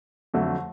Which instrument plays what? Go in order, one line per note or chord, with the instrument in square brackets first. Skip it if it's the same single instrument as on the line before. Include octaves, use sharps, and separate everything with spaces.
[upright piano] F2 D3 F#3 A3